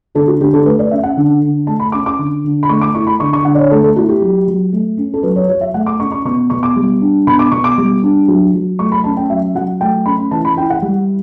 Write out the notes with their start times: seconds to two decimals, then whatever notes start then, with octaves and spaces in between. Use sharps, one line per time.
0.15 D3 A4
0.28 F#4
0.40 D3 G4
0.53 A4
0.66 A3 B4
0.79 D5
0.91 C#4 E5
1.03 F#5
1.17 D3
1.42 D3
1.67 A3 A5
1.80 B5
1.92 C#4 D6
2.06 D6
2.18 D3
2.44 D3
2.63 B5
2.69 A3 C#6
2.81 D6
2.95 E4 C#6
3.07 B5
3.20 D3 C#6
3.33 C#6
3.45 D3 F#5
3.55 D5
3.58 C#5
3.71 A3 A4
3.84 A4
3.96 E4 F#4
4.09 G4
4.21 F#3
4.48 F#3
4.72 A3
4.97 C#4
5.14 A4
5.23 F#3 B4
5.36 C#5
5.48 F#3 C#5
5.61 E5
5.74 A3 F#5
5.86 D6
6.00 C#4 C#6
6.12 C#6
6.25 B2 C#6
6.50 B2 C#6
6.63 D6
6.76 G3
7.01 D4
7.27 B2 B5
7.39 D6
7.51 B2 C#6
7.64 D6
7.78 G3
8.03 D4
8.28 F#3
8.54 F#3
8.79 A3 C#6
8.92 B5
9.04 C#4 A5
9.17 G5
9.30 F#3 E5
9.55 F#3 F#5
9.81 A3 G5
10.06 C#4 B5
10.31 E3 A5
10.45 B5
10.56 E4 G5
10.70 F#5
10.82 G3